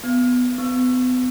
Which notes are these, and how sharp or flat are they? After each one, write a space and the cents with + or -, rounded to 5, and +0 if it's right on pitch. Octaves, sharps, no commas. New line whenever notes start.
B3 +10
B3 +40